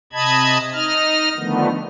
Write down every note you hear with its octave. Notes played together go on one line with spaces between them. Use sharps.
C3 D#5 A5 B5 G#6
D#4 D#5 F6
D3 D#3 F3 A3 B3